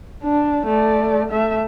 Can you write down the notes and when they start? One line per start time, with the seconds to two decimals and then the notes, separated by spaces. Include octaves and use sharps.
0.23 D4
0.66 A3 D5
1.31 A3 E5